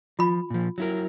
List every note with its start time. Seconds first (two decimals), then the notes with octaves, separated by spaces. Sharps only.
0.19 F3 F4 B5
0.50 A#2 F3
0.78 F#3 E4 A#4